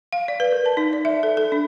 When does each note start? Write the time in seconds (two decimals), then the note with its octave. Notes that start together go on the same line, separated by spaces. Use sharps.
0.13 F5
0.28 D5
0.40 B4
0.52 A#4
0.66 A5
0.77 D#4
0.93 D5
1.05 E5
1.23 A4
1.37 A4
1.52 D4